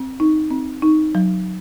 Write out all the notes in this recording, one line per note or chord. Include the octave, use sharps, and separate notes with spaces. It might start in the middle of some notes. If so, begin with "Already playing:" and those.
Already playing: C4
D#4
C4
D#4
F#3